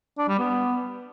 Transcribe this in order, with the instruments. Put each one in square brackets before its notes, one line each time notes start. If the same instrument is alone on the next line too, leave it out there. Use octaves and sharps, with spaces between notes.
[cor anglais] D4
G3
B3